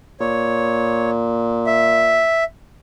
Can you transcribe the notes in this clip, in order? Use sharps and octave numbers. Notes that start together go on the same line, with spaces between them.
A#2 C#5
E5